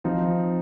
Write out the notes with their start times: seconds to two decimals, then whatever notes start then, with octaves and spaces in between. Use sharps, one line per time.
0.04 F3 C4 D#4